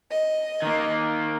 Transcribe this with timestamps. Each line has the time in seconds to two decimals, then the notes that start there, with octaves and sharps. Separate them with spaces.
0.11 D#5
0.62 D#3 A#3